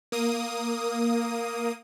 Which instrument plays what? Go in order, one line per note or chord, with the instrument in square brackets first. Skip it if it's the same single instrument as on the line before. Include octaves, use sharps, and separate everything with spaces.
[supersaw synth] A#3 D#6